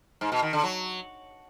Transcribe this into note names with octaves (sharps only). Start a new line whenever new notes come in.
G#2
B2
D#3
D3
F#3